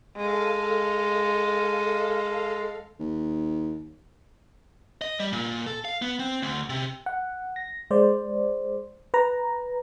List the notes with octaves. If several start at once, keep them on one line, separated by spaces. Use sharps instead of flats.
G#3 A4 F5
D#2
D#5
G3
A#2
A4
F5
B3
C4
D2
C3
F#5
A#6
G#3 C5 D5
B4 A#5